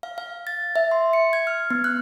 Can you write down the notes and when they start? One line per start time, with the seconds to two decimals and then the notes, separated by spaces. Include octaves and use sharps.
0.03 F5
0.18 F5
0.47 A6
0.76 E5
0.91 C6
1.13 C#7
1.33 G#6
1.47 F6
1.71 B3
1.84 F#6